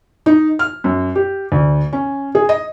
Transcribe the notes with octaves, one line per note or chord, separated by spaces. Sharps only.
D#4
F6
F#2
G4
D2
C#4
G#4
D#5